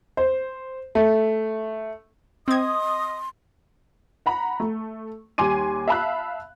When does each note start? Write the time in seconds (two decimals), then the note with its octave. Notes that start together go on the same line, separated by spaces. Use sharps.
0.17 C5
0.95 A3
2.48 C4 D#5 C6 D#6 G#6
4.26 F#5 A#5 B5
4.60 A3
5.38 D#2 G3 G#5 C6 D6 D#7
5.88 E5 F5 A5 B5 E6 F#6